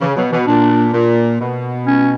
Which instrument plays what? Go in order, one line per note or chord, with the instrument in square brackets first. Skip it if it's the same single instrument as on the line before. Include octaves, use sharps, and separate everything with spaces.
[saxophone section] C#3 [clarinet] E3
[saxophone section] B2 [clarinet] F#3
[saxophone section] B2 [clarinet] E3
[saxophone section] A#2 [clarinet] D4
[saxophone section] A#2
B2
[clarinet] C#4